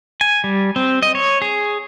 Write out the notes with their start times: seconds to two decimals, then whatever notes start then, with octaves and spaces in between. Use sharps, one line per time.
0.21 G#5
0.44 G3
0.76 C4
1.02 D#5
1.15 C#5
1.42 G#4